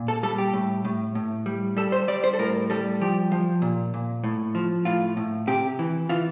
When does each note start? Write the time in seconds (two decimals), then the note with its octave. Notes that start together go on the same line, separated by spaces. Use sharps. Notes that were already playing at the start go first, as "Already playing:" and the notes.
Already playing: A#2
0.08 A4
0.23 G3 A4
0.38 G4
0.53 A2
0.85 A2
1.15 A2
1.46 G3
1.77 G3 A4
1.92 C5
2.08 G3 D5
2.24 C5
2.33 A4
2.39 A2 A#4
2.70 G3 A4
3.01 F3 G4
3.32 F3
3.62 A#2
3.94 A#2
4.24 A2
4.55 F3
4.85 A2 F4
5.17 A2
5.47 C3 G4
5.79 E3
6.09 E3 F4